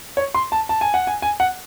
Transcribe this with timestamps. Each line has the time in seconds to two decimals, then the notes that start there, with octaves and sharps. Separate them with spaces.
0.17 C#5
0.34 C6
0.52 A5
0.69 A5
0.81 G#5
0.94 F#5
1.07 G#5
1.22 G#5
1.40 F#5